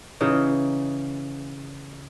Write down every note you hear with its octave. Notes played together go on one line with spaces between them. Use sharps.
C#3 E3 D#4